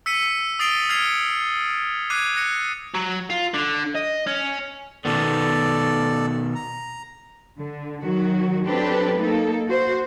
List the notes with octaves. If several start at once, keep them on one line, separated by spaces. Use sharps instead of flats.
E6 B6 C#7 D#7
D#6 A6 C7 D7 F7 G7
F6 G#6 C7 C#7 F7 G7
D6 F#6 G#6 C7 D#7
F#6 A#6 C#7
F#3
F4
D3
D#5
C#4
B2 D#3 B3 A4 D5
A#5
D3
D#3 F#3 F#4
F#3 C4 D4 G4 A4 B4
A#3 D#4 A4
F#4 C5